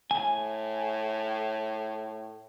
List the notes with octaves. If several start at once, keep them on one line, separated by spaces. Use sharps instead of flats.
A2 G#5